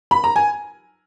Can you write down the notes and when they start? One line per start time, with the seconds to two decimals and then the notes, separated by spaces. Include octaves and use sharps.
0.11 B5
0.24 A#5
0.36 G#5